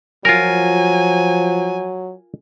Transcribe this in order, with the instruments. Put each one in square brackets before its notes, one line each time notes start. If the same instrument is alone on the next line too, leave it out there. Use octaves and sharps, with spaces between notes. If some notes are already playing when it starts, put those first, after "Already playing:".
[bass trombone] F3 [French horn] F#3 [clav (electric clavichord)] F4 A#4 [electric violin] G#5